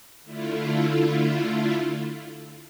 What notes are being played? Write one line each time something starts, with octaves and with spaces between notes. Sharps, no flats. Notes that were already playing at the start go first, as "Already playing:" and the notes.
D3 A3 E4 F4